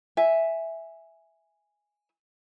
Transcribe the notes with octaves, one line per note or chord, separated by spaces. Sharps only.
E5 G#5